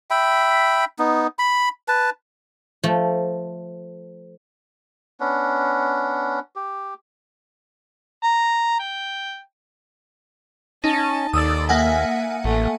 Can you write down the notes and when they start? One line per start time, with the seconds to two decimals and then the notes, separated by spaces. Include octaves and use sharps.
0.11 E5 G5 B5
0.99 B3 D#4
1.39 B5
1.88 B4 A5
2.84 F3 A3
5.20 B3 C#4 D4
6.56 G4
8.24 A#5
8.80 G5
10.84 C#4 D#4 A5
11.33 D#2 A4 D5 D#6 E6 A6
11.69 A#3 E5 F#5 G#5
12.44 A1 A3